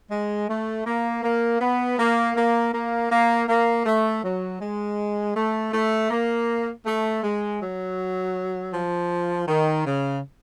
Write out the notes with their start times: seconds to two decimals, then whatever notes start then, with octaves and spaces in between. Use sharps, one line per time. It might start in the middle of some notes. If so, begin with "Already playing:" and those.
0.11 G#3
0.49 A3
0.87 A#3
1.24 A#3
1.61 B3
1.99 A#3
2.37 A#3
2.74 A#3
3.11 A#3
3.49 A#3
3.86 A3
4.24 F#3
4.61 G#3
5.36 A3
5.74 A3
6.11 A#3
6.86 A3
7.24 G#3
7.61 F#3
8.74 F3
9.48 D#3
9.86 C#3